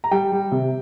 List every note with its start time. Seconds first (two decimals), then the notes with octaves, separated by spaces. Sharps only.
0.04 A#5
0.11 G3 G5
0.32 G3
0.52 C3